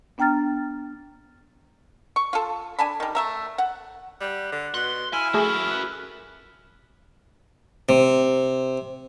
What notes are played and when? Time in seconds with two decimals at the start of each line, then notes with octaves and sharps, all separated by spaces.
0.18 B3 D4 G5 A#5 F6 A6
2.16 C#6
2.33 F4 A4
2.79 D4 G#5 A5 B5
3.00 D#3 G3
3.15 A3 E5 A#5
3.58 F#5
4.21 G3 F#5
4.52 D3
4.74 B2 C6 F#6
5.13 E4 F5 G#5
5.34 A3 F#4 G#4 A#4
5.69 B4
7.89 C3